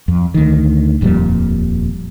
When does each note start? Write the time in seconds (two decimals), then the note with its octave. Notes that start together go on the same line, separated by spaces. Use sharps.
0.08 F2
0.34 D2 D#3
1.01 D#1 F2 A#2 G3